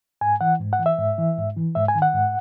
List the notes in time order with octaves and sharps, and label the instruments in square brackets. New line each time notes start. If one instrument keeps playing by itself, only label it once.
[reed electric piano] G#2 G#5
E3 F#5
G#2
F#5
E3
E5
G#2
E3
G#2
E3
G#2 E5
G#5
D#3
F#5
G#2